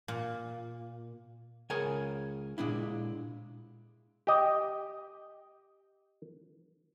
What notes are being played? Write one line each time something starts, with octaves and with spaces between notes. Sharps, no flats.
A#2
C#2 G#4 A#4 C#5 G#5
A#2 G#3 D4 E4
G4 D#5